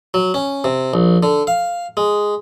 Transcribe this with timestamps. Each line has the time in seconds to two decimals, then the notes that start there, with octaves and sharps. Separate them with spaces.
0.14 F#3
0.34 C#4
0.64 C3
0.94 A#1
1.23 D3
1.47 F5
1.97 G#3